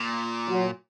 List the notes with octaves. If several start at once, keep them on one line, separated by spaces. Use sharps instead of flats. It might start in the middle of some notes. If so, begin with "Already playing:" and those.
Already playing: A#2
F#3